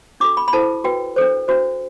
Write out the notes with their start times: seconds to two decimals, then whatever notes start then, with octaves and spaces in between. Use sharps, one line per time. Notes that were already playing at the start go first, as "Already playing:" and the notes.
0.20 D4 F#4 A4 D6
0.37 B5
0.48 B5
0.53 E4 A4 C5 A5
0.84 F#4 B4 G5
1.16 D4 A4 C5
1.48 D4 F#4 C5